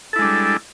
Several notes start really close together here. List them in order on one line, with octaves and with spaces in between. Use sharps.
A4 E4 G#3 D4 G3